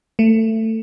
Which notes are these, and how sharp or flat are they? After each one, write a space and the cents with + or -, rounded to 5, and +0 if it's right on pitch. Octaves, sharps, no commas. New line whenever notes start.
A3 +20